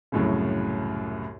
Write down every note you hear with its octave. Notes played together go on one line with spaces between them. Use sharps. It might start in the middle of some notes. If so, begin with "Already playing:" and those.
C2 F#2 A2 C#3